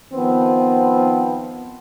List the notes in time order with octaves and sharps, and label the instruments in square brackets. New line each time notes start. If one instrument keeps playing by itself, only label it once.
[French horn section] D#3 F3 B3 C4